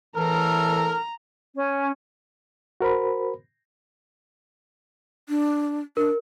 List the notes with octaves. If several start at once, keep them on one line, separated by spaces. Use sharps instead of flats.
E2 A2 E3 A4 A#4 A#5
C#4
F#4 A#4 C5 B5
D4
D4 A#4